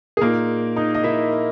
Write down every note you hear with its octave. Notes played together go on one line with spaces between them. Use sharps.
G#4
A#2 A#3 D#4 A#4
D#4 D#5
D#5
E4 E5